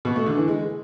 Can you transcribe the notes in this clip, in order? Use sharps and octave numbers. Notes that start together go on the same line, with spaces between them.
B2
A3
D3
E3
G#3